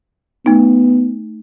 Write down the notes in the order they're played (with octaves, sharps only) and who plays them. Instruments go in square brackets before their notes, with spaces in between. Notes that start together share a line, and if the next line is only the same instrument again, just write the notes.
[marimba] A3 D#4 [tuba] B3